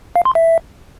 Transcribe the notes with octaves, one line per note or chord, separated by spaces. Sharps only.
F5
C6
E5